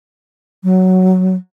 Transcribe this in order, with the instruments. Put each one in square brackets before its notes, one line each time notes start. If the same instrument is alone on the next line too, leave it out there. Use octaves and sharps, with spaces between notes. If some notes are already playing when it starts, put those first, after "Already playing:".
[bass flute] F#3